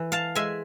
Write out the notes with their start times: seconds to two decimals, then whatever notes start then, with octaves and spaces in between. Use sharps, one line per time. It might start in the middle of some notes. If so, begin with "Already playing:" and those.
Already playing: E3
0.12 F5 A5
0.35 G#3 E5 G#5